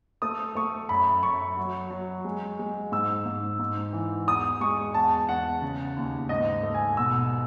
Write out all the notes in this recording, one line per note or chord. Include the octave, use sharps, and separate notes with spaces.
A3 D#6
A3 C#6
F#2 B5
F#2 C#6
F#3
F#3
G#3
G#3
G#2 E6
G#2
G#2
E3
E2 D#6
G#3 C#6
E2 A5
E2 F#5
C#3
D#2
G#2 D#5
A3
G#5
B2 E6